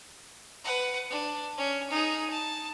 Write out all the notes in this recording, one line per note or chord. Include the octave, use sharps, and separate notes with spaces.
B4 F#5
D4
C#4
D#4 G#4
A5